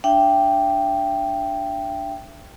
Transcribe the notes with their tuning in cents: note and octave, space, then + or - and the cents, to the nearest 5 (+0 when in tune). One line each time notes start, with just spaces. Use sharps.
D4 +0 E5 +35 G5 +0